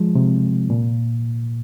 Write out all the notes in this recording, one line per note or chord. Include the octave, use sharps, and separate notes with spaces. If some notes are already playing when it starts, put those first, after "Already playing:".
Already playing: F3 G#3
C3
A#2